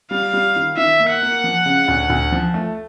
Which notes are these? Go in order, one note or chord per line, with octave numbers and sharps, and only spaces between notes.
G3 F5
G3
D#3
D#3 E5
A#3
F#5
A#3
F3
C#3
D2
D2
F3
A3